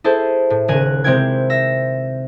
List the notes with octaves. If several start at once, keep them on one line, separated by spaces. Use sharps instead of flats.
E4 G#4 A4 C5
A2
D#1 C#3 A#4 G#5 F#6 D#7
C3 G#3 C4 E4 G5 G#6
E5 A#6